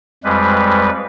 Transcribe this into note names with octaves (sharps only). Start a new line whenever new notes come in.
F2 G3 G#3 B4